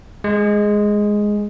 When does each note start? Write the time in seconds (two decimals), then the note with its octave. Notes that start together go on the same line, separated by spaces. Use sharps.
0.24 G#3